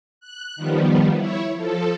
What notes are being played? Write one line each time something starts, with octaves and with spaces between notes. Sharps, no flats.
F#6
D#3 F3 G3 B3
E4 C#5
F3 A4